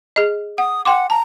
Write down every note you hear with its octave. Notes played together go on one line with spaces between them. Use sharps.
G#4 D#5
F#5 D#6
F#5 G5 C6 D6
A5 A#5